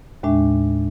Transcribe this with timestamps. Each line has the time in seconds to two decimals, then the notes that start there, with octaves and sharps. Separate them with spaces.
0.23 D#2 A2 G#3 D4 E5